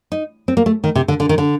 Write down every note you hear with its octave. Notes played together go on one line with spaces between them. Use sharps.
D#4
C4
A#3
A3
D#3
C3
D3
D3
D#3
D3